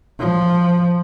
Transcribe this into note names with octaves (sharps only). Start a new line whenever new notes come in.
F3